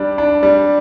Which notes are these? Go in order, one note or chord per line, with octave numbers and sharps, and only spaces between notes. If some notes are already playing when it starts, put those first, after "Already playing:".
Already playing: G3 D4
D4
G3